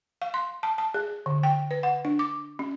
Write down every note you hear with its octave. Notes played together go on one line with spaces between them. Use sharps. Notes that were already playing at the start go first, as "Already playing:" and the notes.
F5
C6
A5
A5
G#4
D3
G5
B4
F#5
D4
D6
C#4